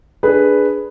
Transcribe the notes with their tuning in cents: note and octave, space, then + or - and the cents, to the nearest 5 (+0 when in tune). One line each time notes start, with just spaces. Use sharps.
D4 +0 G#4 +0 B4 +0